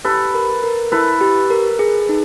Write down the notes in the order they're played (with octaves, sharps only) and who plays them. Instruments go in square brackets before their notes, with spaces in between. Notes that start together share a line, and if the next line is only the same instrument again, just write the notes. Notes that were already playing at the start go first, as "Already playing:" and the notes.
[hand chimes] G4 [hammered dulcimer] A4 B4
[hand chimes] A#4
A#4
[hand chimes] E4 [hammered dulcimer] A4 B4
[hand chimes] G4
A#4
G#4
D#4